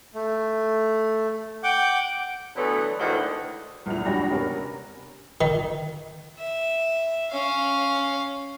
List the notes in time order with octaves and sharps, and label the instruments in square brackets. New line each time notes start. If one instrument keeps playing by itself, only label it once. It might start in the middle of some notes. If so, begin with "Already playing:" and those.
[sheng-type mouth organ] A3
F#5 G5 D6 G6
[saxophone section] D3 E3 F#3 A3 B3
D2 A2 D#3 E3 G#3 F#5
[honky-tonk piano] B1 E2 A#2 E4 F7
G#1 D4 F#4 G4 B5 A#6
C3 B3 C#4 A#4
[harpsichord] D#3
[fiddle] E5
C#4 F5